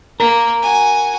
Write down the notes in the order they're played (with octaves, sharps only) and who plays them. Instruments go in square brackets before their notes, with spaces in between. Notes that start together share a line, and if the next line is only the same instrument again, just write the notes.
[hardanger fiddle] A#3 [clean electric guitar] A#4
[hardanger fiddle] F#4 G#5